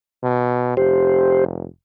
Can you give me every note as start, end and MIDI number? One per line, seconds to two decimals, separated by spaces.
0.23 0.74 47
0.77 1.66 29
0.77 1.45 67
0.77 1.45 72